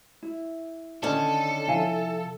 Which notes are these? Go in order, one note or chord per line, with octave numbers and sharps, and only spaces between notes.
E4
D3 D#3 C#4 A4 D5
C3 F3 E4 F5 G#5